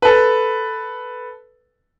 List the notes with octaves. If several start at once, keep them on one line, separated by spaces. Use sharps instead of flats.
A4 B4